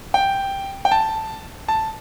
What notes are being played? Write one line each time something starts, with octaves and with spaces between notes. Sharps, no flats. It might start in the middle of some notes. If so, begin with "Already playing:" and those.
G5
G5
A5
A5